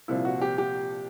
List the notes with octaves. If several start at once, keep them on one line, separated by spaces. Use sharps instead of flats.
C2 A#2 F3 E4
F#4
G4
G4